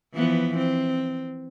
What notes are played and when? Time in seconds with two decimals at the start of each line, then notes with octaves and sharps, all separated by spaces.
0.14 E3 F3 B3
0.57 C4